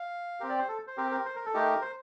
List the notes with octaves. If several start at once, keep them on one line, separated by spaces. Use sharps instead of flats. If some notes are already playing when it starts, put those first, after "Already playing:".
Already playing: F5
C4 G4 A#4
D5
C5
A4
C5
C4 G4 A#4
A#4
C5
A#4
A4
A3 D#4 G4 A#4
C5